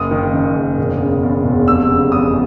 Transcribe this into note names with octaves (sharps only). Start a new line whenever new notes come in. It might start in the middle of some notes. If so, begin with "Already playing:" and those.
Already playing: F#1 D#6
D#3
F#2
F#1
E1
C#3
E2
E1
F1 E6
C#3
E2 D#6